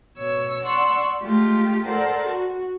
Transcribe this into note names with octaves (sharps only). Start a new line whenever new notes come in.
B2 C#5 E6
D5 F#5 C6 C#6 E6
G#3 A3 F4 G4
A4 A#4 C5 D5 F#5 A5
F#4